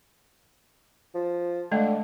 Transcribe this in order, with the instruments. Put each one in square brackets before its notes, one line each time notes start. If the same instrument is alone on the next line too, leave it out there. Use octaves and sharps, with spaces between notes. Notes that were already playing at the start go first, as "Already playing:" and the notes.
[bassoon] F3
[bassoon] D3 [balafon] G#3 A3 D#5